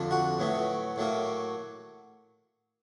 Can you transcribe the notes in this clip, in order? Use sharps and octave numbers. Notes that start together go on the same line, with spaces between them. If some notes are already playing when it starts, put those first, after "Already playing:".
Already playing: F2 D3 F3
F#4
A2 F#3 B3
A2 F#3 A#3